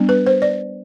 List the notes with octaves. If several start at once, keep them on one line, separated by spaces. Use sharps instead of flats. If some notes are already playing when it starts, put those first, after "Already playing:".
Already playing: G3 B3 D4
B4
C5
D5